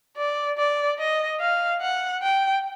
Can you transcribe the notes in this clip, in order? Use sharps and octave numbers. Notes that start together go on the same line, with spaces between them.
D5
D5
D#5
F5
F#5
G5